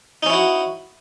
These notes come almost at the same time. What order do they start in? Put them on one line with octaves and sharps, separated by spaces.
D#4 C#4 E4 F#4